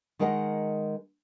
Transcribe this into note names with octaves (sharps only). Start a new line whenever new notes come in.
D#3 G#3 A#4 D#5 F5 F#5